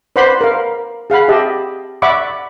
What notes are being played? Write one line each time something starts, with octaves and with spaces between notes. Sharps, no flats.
B4 C5 D5 F#5 B5 C6
A#4 F5
G#4 F5 F#5 B5
G4 D#5 E5 A5
D5 E5 F#5 B5 C#6 D6